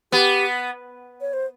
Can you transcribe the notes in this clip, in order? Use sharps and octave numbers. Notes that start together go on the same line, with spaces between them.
B3 G4
C#5
C5